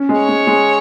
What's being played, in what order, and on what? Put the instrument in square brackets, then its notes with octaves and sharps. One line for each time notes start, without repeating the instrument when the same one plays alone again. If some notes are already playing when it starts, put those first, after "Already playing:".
Already playing: [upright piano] C#4
G#3
[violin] C#5
[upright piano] G#3
G#3